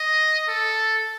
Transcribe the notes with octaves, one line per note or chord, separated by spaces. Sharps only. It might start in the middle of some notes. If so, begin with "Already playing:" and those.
Already playing: D#5
A4